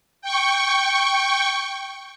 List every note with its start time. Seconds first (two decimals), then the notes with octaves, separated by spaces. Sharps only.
0.22 G5 C#6